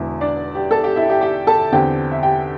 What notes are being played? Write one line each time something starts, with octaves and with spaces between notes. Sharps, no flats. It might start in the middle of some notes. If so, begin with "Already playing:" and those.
Already playing: E1 E2 D3 E4
D4 D5
G4
A4 A5
G4 G5
E4 E5
G4
G4 G5
A4 A5
E2 D3 C4 G4 G5
E5
G4 G5